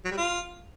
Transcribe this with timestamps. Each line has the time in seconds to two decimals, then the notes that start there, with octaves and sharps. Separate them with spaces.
0.05 F#3
0.11 G3
0.18 F4